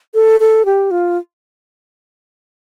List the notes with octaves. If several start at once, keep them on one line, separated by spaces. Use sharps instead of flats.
A4
A4
G4
F4